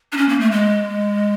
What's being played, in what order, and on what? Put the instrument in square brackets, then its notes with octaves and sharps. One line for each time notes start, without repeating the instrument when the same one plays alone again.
[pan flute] D4
C#4
A#3
A3
G#3